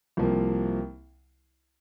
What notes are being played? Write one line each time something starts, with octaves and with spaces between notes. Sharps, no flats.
C2 C3 F3 A#3